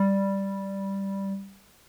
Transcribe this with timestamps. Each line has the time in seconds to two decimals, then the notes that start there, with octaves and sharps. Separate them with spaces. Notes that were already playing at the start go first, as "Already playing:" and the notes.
Already playing: G3